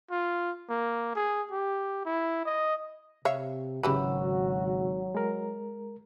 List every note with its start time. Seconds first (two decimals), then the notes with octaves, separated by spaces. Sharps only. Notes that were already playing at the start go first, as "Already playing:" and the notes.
0.11 F4
0.69 A#3
1.16 G#4
1.52 G4
2.05 E4
2.46 D#5
3.25 C3 C#5 E5 F5
3.83 G#1 C#3 E3 F#3 F#4 G4 B4 E6
5.15 G#3 A#4